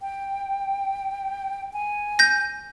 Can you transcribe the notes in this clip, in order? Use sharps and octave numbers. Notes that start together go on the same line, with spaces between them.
G5
G#5
G6 A#6